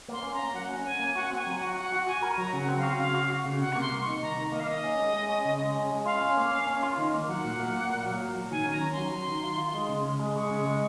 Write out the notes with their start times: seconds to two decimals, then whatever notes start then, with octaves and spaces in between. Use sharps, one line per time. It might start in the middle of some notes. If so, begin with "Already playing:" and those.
0.08 A#3 C6
0.23 C#4
0.34 A#5
0.39 A#3
0.54 F#3 F#5
0.69 C#4
0.85 C#4 G#5
1.00 A#3
1.16 F#4 F#5
1.31 C4
1.36 G#5
1.46 F#3
1.56 F#5
1.61 F#4
1.76 F#4 F#5
1.92 F#4
2.07 F#4 G#5
2.22 A#4
2.38 F#3 A#5
2.53 C#3
2.58 F#5
2.69 C4
2.78 F#4 F5
2.99 C#3 F5
3.15 F#4
3.30 F#4
3.46 C#3
3.61 C3 F#5
3.73 A#3 C#6
3.81 C6
3.91 C2
4.02 D#3 C#6
4.22 C2 A#5
4.37 D#3
4.52 A#3 D#5
4.60 F5
4.68 A#3 D#5
4.84 C#4
4.99 G#3
5.14 G#3
5.29 C#4
5.45 C#3
5.60 G#3
5.75 C#4
5.91 G#3
6.06 F4 F5
6.21 C#4
6.37 A#3
6.52 C#4
6.67 C#4
6.83 F4
6.98 D#3
7.14 A#3
7.29 F#3 F#5
7.44 A#2
7.59 A#3
7.75 A#2
7.90 A#3
8.06 F#3
8.20 A#2
8.35 F#3
8.51 D#3 G#5
8.66 C#4
8.72 A#5
8.81 C#4
8.92 C6
8.97 F#3
9.13 F#3
9.28 D#3
9.44 F4
9.58 F4
9.74 G#3
9.89 C#3
10.04 C#2
10.20 G#3
10.36 G#3 C#6
10.51 C#3
10.66 G#3